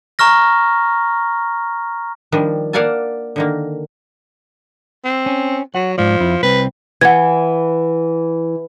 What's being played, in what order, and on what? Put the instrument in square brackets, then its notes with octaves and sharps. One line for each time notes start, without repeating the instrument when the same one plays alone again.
[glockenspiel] A#5 C#6 F6 A#6
[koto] D#3 F3 G3 D4
A#3 D5 F5 F#5 G#5 A5
D3 D#3 A#3
[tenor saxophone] C4
[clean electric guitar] C#4
[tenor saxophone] F#3 [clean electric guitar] F#5
[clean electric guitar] G#2 D5 [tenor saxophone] F3
[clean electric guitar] F2 E4 F4
[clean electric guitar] C2 C4 [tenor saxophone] B4
[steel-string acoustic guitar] E3 [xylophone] F#5 G#6